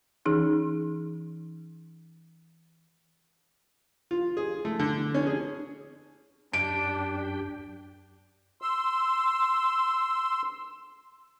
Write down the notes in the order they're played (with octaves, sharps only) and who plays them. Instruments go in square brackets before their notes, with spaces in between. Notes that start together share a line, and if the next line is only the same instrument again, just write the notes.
[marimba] E3 C#4 D#4 G#4
[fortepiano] F4
G#4
A3
D3
C#4
G#4
[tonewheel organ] F#2 G4 G5 [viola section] D4 [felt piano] D7
[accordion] C6 E6